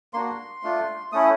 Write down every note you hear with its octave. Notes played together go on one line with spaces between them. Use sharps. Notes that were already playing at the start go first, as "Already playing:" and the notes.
A#3 D4 F#4 C6
A3 D4 F4
A3 C#4 E4 D#6